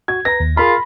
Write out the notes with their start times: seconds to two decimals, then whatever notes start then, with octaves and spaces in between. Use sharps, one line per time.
0.08 F#4 G#6
0.25 B4 A#5 A#6
0.40 D#2
0.57 F4 G#4 A#4 F5 B5